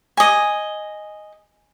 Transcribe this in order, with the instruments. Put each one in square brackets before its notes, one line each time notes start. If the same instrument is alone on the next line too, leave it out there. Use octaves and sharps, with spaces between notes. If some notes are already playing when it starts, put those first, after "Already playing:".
[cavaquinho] D#5 G#5